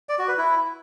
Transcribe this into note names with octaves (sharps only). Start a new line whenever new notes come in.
D5
F#4
B4
E4